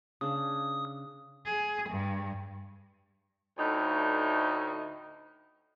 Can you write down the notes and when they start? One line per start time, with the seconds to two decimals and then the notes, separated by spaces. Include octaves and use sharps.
0.21 C#3 D4 D#6
1.45 G#4
1.89 G2
3.57 D2 A2 D#4